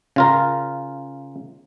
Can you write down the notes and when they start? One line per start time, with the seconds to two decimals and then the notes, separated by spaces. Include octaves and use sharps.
0.16 C#3 F4 A#4